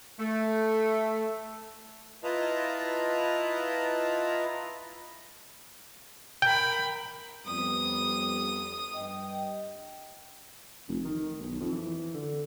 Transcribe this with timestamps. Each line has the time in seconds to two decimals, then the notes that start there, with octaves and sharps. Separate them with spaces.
0.19 A3
2.24 E4 F4 B4 D#5 A5 A#5
6.42 A#4 G5 B5
7.47 F2 G3 B3 D#6
8.95 G2 D#5 G5
10.88 F1
11.05 D#3
11.40 B1
11.60 F2
11.72 E3
12.14 D3